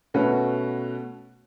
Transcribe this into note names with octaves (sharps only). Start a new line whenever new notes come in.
B2 A3 C#4 F#4 B4